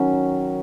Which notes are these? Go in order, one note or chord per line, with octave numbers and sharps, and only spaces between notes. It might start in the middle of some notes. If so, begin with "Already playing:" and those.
Already playing: D#3 F#3 C#4